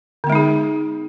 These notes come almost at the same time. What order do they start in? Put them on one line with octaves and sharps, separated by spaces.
D3 B3 G#3 D#4 G#4